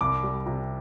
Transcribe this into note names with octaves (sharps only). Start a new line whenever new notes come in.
C2 D6
G3
C3